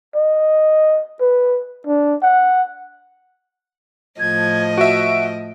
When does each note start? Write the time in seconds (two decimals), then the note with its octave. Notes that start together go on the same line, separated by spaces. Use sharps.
0.15 D#5
1.21 B4
1.87 D4
2.23 F#5
4.19 A2 F3 D#5 G#6
4.78 F#4 E5 D7